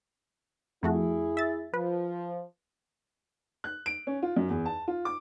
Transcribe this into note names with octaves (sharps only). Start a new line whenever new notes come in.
F2 A3 E4 F#4 G#4
E5 A6
F3 B4
F#6
D7
C#4
F4
F#2
E2
A5
F4
D6